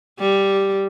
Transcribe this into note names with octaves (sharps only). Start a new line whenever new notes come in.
G3